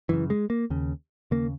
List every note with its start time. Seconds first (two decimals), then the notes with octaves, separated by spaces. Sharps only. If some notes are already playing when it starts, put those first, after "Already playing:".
0.09 F#2 C#3 E3
0.30 G#3
0.50 A#3
0.70 D#2 C#3
1.31 D#2 C#3 A#3